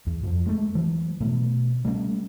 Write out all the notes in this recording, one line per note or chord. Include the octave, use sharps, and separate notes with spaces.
E2
F2 F3
G#3 A3
E3 F#3
B2 A3 B3
G3 A3 A#3 C#4